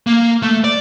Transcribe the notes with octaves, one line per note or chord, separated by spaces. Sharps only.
A#3
A3
D5